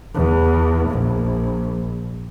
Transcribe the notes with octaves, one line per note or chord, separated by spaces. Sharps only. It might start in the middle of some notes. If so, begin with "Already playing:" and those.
E2
A#1